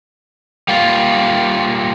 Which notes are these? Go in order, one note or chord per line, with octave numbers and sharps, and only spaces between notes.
G3 A#3 F4